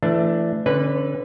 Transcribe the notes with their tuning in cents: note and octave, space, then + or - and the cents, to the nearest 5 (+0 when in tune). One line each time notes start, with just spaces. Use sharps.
E3 +30 A3 +0 D4 +0
D3 -15 C#4 -40 B4 -5